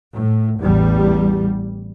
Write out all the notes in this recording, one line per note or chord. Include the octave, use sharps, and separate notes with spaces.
A2
A1 E2 G3